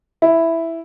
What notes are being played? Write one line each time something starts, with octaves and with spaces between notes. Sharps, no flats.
E4